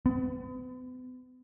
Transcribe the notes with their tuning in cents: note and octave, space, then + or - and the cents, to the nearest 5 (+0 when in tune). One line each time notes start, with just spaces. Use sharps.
B3 +40